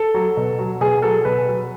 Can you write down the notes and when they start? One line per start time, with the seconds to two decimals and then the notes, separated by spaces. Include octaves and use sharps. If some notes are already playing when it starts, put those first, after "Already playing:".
Already playing: A4
0.14 F#3
0.37 B2
0.59 F#3
0.81 B2 G#4
1.02 F#3 A4
1.25 B2 B4
1.47 F#3